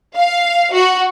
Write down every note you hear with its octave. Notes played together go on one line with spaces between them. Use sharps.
F5
F#4